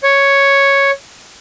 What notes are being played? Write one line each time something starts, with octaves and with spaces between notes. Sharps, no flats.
C#5